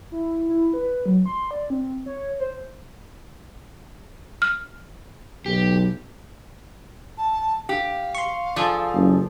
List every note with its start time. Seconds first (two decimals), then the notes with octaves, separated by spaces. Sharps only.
0.12 E4
0.49 E4
0.73 B4
1.06 F#3
1.26 C6
1.51 D5
1.70 C4
2.06 C#5
2.40 C5
4.42 F6
5.46 B1 G4
7.18 A5
7.69 G4 F5
8.15 C6 C#6
8.56 F3 G#4 A4 D5
8.94 F#1